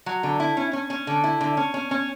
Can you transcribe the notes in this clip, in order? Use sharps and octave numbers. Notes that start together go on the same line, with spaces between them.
F#3
D3
E4
C#4
C#4
C#4
D3
E4
D3
C#4
C#4
C#4